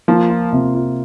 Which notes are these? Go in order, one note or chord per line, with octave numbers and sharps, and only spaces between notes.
F3 A#3
F4
C3
F4